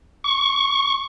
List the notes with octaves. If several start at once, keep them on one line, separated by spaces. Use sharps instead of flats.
C#6